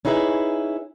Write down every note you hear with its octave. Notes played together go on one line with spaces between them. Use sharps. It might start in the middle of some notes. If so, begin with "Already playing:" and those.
C#4 D#4 E4 G#4 B4